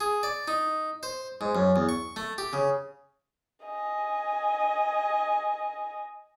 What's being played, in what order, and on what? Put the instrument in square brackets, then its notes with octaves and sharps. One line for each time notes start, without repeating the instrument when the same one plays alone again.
[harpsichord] G#4
D5
D#4
C5
G#2
F#2
E2
C#6
A3
G4
C#3
[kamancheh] D#5 G#5